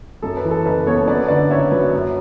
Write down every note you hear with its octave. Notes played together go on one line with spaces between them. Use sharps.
F#2 A4
B4
E3
A4
F#1 B4
B3 A4 C#5
F#2 B4 D5
D3 B4 D5
F#1 C#5 E5
F#3 B4
F#2